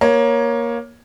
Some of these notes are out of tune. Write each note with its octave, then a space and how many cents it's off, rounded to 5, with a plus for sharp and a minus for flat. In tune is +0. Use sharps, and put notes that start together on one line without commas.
A#3 +15 C#5 +0